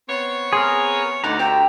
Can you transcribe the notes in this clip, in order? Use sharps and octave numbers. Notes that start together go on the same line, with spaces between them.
B3 C4 C#5
G#4 A#4 C6
D2 D#4 D5 F#5 A#5
G4 E5 G5